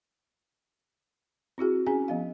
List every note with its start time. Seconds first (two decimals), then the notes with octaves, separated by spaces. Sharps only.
1.58 C4 E4 F#4 G#4
1.87 C#4 F#4 G#4 G#5 A#5
2.08 F3 B3 F5